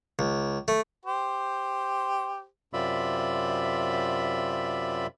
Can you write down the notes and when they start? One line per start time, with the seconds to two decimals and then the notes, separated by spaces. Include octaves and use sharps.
0.19 C#2
0.68 A3
1.05 G4 C5
2.73 F#2 C3 F4 D5 E5 B5